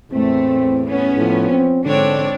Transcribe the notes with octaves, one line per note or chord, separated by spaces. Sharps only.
E2 A2 A3 C4
B3 C#4
A2 F3
C4
G#2 D3 C4 D4 C#5